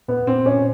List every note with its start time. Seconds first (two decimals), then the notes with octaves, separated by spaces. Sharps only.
0.08 A#2 B3
0.27 A#2 C4
0.45 A#2 C#4